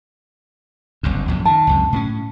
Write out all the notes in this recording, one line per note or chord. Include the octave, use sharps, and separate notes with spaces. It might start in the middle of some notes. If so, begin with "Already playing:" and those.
F#1 C2 G2
A#1 F#2 A2
D#3 A5
C#2 F#2 C3
A2 G3 C#4